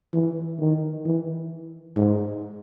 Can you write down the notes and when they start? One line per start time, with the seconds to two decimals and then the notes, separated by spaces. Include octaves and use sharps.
0.14 E3
0.59 D#3
1.05 E3
1.96 G#2